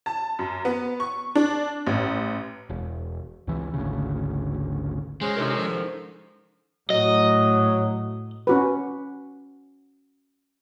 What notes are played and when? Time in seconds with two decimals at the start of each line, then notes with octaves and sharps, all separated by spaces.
0.06 A5
0.39 F#2
0.65 B3
1.00 C#6
1.35 D4
1.87 A1
2.70 E1
3.47 C#2 E3
3.74 G#1 D2 C#3
5.21 G#3 C#4 F#4 G#4 C5
5.37 C3 D#4 A4 A#4
5.57 F3
6.90 A2 F#3 D#5
8.47 C#4 F#4 B4